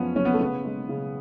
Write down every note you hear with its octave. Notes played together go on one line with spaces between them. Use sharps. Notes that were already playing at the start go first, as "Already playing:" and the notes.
Already playing: F#2 F3 B3 C#4
F#1 C#4
B3
A3
C#3 B3
G#3
C#3